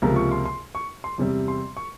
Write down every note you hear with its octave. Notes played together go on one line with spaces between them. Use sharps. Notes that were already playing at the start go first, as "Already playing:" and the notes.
C#2 C3 F3 A#3 A#5
C#6
C6
C6
C#6
C6
E2 C3 G3 C4
C6
C#6